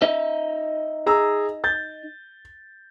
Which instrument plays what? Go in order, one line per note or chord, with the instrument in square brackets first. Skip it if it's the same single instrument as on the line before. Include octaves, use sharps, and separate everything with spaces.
[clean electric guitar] D#4 D#5 E5
[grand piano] G#4 A#5 E6
G6 A6